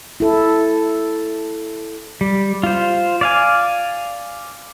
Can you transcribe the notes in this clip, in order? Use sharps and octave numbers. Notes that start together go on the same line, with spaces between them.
E4 A4
G3
F4 C5
D5 F5 G#5